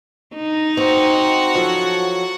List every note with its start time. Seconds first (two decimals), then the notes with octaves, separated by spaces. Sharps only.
0.36 D#4
0.77 C4 F#4 F#5
1.55 F3 F#3 A4